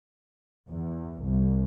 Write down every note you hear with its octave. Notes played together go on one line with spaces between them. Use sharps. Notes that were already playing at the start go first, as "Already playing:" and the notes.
E2
C2